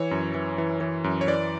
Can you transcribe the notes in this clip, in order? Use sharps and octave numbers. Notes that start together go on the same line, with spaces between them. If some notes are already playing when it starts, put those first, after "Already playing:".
Already playing: E3 C#5
F#2
E3
E3
E3
F#2
C#5
E3 D5